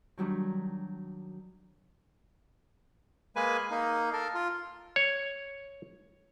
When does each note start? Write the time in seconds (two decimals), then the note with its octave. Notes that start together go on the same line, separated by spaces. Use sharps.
0.17 D#3 F#3 G3 D4 D#4
3.36 G#3 A#3 B4 G#5
3.71 A#3 D#4
4.13 A4 A#4
4.34 F4
4.96 C#5